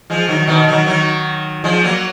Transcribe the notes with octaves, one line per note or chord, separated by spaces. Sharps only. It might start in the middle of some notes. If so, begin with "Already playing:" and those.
F3 G#3
D#3 F#3
B2 D#3
D#3 F#3
D#3 F#3
F3 G#3
F#3 A#3